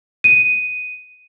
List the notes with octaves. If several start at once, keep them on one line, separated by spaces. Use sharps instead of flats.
D#7